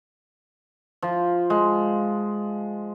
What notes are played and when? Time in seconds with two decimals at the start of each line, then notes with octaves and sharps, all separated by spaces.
1.02 F3
1.50 G#3